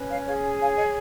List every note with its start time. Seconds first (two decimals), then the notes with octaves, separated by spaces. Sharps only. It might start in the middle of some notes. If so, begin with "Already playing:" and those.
Already playing: C#4 B4
0.10 C#5 F5
0.26 G#4 C#5 F5
0.59 C#5 F5 G#5
0.76 D#5 F#5